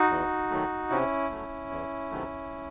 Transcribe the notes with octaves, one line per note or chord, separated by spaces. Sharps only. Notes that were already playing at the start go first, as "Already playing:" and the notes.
Already playing: D#4 F#4
E2
D#3 F#3 A3
C3 C#4 E4
F#3 A3
E2
C3 D#3 F#3 A3